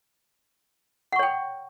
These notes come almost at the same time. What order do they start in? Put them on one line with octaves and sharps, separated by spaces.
F#5 C#6 C#5 G5